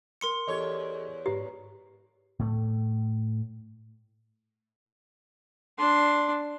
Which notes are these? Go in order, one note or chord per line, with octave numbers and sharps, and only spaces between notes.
A#4 C6 C#7
E2 G4 A4 C#5 D#5
G#2 G4 B4 A#5
A2 A3
D4 C6